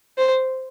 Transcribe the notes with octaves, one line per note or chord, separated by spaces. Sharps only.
C5